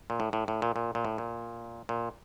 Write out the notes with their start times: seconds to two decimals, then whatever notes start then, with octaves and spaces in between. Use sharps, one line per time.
0.10 A#2
0.20 A2
0.33 A2
0.48 A2
0.62 A#2
0.76 A#2
0.95 A#2
1.05 A2
1.18 A#2
1.89 A#2